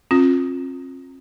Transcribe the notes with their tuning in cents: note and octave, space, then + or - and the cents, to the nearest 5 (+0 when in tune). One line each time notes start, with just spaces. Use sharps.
C4 +45 F4 +20